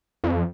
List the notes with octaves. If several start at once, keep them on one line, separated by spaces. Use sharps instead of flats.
F2